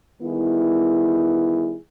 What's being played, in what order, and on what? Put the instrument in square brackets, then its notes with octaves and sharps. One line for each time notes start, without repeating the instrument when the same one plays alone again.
[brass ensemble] D#3 G3 B3 E4 G#4